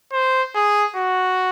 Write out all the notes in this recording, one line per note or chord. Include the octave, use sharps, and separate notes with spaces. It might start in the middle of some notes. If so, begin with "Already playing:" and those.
C5
G#4
F#4